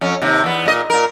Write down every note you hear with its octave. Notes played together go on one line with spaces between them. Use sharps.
F2 C#4
D#2 C3
E2 B3
A#2 D#5
A#2 A#4